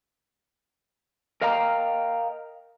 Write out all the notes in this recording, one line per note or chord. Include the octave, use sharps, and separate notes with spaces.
A#4 D#5 F5 G5 A#5